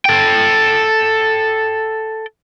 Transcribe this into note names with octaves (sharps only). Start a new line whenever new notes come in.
A4 G5